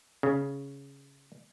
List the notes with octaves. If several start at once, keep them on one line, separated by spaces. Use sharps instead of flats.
C#3